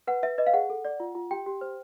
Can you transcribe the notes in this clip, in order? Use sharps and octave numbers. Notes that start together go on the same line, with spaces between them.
B4 F#5
B4 E5
B4 D#5
F5
G#4 F#5
A4
D5
F4
F4
G4 G5
G4
C5